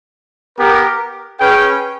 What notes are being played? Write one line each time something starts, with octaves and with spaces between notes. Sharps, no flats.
B3 G4 A#4
C#4 G#4 B4 G5